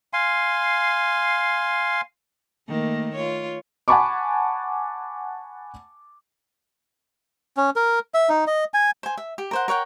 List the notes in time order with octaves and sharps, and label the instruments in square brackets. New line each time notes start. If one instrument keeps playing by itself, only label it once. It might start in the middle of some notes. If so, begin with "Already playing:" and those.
[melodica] F5 G#5 C6
[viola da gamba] D#3 A3 A#3
F4 C#5
[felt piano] F#5 G#5 A5 B5 C#6 D6
[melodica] C#4
A#4
E5
D#4
D#5
G#5
[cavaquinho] C5 G#5
E5
G4
A#4 C5 F#5
A#4 C#5 F#5 G5